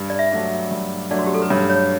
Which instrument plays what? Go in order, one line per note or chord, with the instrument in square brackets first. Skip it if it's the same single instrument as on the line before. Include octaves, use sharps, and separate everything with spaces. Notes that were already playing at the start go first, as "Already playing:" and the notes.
Already playing: [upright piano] G2
[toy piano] D5
E5
[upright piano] F#3 A3 D4
G2
[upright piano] F#3 A3 D4 [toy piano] D5
[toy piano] F#4
G4
A4
B4
[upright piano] G2 [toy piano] C#5
[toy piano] C#5